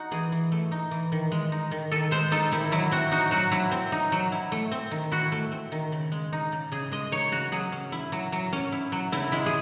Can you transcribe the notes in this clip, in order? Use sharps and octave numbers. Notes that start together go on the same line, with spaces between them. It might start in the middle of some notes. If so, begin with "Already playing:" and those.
Already playing: D#4 F#4
E3 G#4
E3
A3
D#4
E3
D#3
G#3
D#4
D#3
D#3 A4
G#3 C5
D#4 A4
D#3 E4
F#3 E4
C4 F#4
D#4 F#4
F#3 F#4
F#3 E4
C4
D#4
F#3
E4
A3
C4
D#3
E4 F#4
A3
C4
D#3
C#3
G#3
D#4
C#3
C#3 G#4
G#3 D#5
D#4 C#5
C#3 F#4
F#3 G#4
C#4
E4
F#3
F#3
C#4
E4
F#3
C#3 E4
G#3 E4
G#4